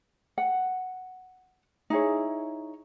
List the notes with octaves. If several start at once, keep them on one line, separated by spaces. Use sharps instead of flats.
F#5
D#4 E4 G#4 C#5